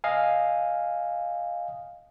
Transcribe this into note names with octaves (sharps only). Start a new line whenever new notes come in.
D#5 F5 G#5